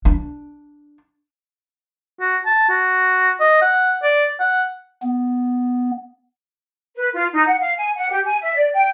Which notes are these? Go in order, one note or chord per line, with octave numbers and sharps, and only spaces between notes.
D4
F#4
A5
F#4
D#5
F#5
D5
F#5
B3
B4
F4
D#4
F#5
F5
G#5
F#5
G4
G#5
E5
D5
G5